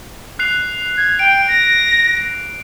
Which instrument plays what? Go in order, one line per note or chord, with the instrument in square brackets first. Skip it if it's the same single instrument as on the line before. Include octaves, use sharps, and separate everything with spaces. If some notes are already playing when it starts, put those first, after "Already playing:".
[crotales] F#6 C7 F7
[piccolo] G#6
[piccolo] G5 [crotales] D7
[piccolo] A#6